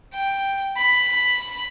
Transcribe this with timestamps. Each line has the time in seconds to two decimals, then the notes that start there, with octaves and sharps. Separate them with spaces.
0.14 G5
0.78 B5